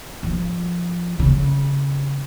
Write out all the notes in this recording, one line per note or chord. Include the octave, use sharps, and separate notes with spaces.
F3
C#3